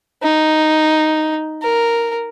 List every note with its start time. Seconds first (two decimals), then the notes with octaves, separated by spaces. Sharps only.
0.23 D#4
1.63 A#4